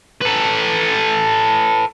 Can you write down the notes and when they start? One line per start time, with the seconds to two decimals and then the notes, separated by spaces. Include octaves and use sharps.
0.22 A4 B4